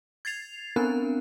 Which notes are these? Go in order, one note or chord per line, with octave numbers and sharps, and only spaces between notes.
G#6 A6 C7 F7
B3 C4 D4 A#4 F#6